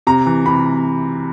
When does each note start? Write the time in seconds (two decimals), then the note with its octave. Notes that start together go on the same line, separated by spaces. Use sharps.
0.07 C3 A#5
0.26 E3
0.46 C3 B5